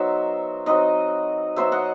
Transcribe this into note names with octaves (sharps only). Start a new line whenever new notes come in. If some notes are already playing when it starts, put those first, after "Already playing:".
Already playing: F#3 B3 D#4 C5 E5
F#3 C4 D#4 B4 D#5
F#3 B3 D#4 C5 E5
D#5 F#5